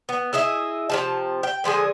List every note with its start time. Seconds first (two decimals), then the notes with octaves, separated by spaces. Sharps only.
0.09 B3
0.33 E4 G#4 D#5 E5
0.90 C3 F3 A5
1.43 G5
1.64 D3 F3 G#3 G#4